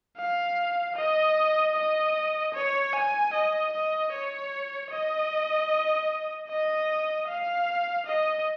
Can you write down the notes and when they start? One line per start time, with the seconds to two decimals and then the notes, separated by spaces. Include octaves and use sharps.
0.17 F5
0.96 D#5
1.75 D#5
2.54 C#5
2.93 G#5
3.33 D#5
3.73 D#5
4.12 C#5
4.90 D#5
6.49 D#5
7.28 F5
8.06 D#5